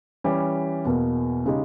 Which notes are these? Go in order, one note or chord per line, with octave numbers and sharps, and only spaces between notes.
E3 G3 C#4 G4
E2 B2 A#3
C#3 G#3 D#4 G4